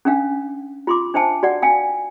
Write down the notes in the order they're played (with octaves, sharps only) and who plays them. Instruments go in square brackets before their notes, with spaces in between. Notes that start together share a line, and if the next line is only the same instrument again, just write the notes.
[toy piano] C#4 D4 F5
F4 C6 D6
D4 C5 E5 G5 A5
F#4 D5 F#5
F5 G5 G#5